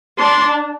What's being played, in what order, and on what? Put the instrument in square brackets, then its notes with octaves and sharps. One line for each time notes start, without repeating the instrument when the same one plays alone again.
[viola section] D4 [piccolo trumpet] C6